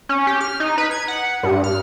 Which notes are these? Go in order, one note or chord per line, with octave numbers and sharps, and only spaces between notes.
C#4
G4
F6
D#4
B4
G#6
F#5
G2
F6